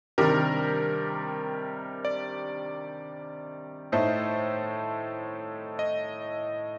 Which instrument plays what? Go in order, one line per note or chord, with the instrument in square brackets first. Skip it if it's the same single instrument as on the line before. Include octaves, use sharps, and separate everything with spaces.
[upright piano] C3 D#3 G3 D4 G4 [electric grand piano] A#4
[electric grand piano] D5
[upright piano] A2 A3 D#4 A4 [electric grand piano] C5
[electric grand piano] D#5